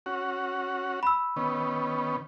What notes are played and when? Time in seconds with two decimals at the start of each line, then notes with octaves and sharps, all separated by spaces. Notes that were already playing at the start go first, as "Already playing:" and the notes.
0.06 C#4 F#4
1.03 B5 E6
1.36 D#3 B3 C#4